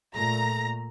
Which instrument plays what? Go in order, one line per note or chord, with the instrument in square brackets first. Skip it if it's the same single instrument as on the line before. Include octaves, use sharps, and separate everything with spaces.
[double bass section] A#2 A3 [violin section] A#5 A#6